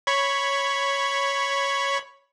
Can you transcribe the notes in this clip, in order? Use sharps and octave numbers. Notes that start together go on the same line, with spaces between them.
C#5 B5 C#6